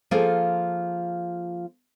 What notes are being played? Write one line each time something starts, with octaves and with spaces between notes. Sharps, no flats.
F3 A#3 F4 G#4 A4